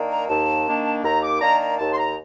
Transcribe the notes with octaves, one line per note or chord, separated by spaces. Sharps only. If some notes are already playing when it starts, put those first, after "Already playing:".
Already playing: D#3 A#3 D4
A#5
D#2 A5
D#3 A#3 D4
D#2 A#5
D6
D#3 A#3 D4 A#5
A#5
D#2 A5
C6
A#5